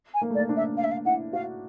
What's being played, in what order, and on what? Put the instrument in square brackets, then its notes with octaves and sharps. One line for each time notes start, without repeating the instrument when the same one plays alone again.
[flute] G#5
[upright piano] A#3
A3
[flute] D5
[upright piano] A#3
D4
[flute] E5
F5
E5
F5
[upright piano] E4 [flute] F#5
[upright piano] F#4 [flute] F5